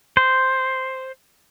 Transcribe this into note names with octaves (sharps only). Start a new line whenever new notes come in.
C5